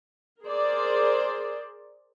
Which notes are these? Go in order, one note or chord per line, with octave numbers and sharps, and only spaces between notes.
G#4 A#4 C5 D5